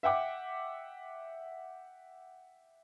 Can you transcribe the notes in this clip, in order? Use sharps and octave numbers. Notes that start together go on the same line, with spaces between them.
E5 F#5 G5 D6